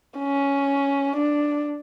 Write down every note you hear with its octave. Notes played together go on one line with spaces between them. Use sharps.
C#4
D4